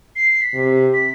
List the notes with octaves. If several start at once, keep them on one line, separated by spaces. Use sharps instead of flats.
C7
B6
C3
B6